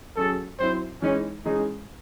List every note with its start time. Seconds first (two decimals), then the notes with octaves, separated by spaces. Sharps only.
0.17 F#3 C#4 G#4 A4
0.60 F#3 C4 E4 C5
1.02 E3 G#3 C#4 D#4
1.45 E3 G#3 C#4 D#4 G#4